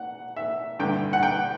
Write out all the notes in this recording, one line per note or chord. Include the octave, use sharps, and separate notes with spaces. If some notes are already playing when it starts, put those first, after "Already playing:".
Already playing: F#5
E5
G2 D3 G5
F#5
G5